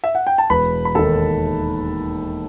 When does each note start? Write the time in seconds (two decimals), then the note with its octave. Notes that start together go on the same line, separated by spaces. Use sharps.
0.04 E5
0.15 F#5
0.27 G5
0.38 A5
0.50 E1 B4 B5
0.85 B5
0.95 D#2 D#3 A4 A5